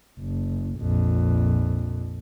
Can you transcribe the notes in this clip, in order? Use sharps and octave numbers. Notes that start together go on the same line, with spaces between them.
F#1
A#1 F2